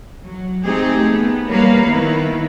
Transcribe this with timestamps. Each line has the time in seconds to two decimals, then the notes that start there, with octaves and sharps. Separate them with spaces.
0.25 F#3
0.64 A3 C4 D#4 G4 G#4
1.13 B3
1.49 G3 A#3 A#4 B4 C#5 F5
1.86 D#3 B3 E4